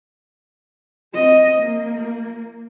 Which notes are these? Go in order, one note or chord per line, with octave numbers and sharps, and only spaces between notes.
C4 D#5
A#3